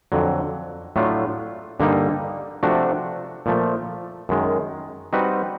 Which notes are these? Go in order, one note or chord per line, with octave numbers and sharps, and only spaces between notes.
F2 D3 F#3
A2 F#3 A3 D4 F4
G2 D3 G3 A#3 D#4
C3 F3 A3 D4 F#4
A#2 F3 A3
F#2 D#3 G#3
G3 C4 D#4 F#4 B4